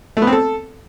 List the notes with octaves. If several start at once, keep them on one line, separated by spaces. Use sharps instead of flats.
A3
B3
C4
A4